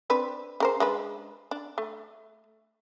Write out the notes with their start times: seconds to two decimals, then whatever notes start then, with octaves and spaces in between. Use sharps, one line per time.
0.10 C4 D4 B4
0.60 C#3 A#4 C5
0.80 G#3 D4 B4
1.51 D4
1.78 A3